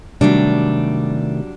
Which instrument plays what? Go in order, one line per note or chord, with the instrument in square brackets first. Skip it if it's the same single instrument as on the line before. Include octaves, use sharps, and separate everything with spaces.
[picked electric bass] C3 D#3 A3 [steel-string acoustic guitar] F#3 G3 D4